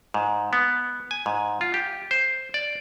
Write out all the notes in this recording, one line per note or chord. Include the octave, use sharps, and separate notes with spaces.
G#2
B3
G#5
G#2
F4
G4
C5
D5